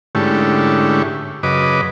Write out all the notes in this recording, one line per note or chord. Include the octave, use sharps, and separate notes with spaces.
G#2 D3 A3 C#4 E4 G4
F#2 C#3 B4 D#5 D6